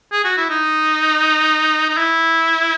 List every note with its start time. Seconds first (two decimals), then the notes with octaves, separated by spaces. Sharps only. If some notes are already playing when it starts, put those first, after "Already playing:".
0.12 G#4
0.24 F#4
0.37 E4
0.50 D#4
1.90 D#4
1.97 E4